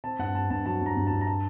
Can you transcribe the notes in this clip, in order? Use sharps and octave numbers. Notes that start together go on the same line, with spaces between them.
C4 A5
G2 F#5
G2 A5
G2 A5
F#3 A5
G2 A#5
G2
G2 A5
A#5
A5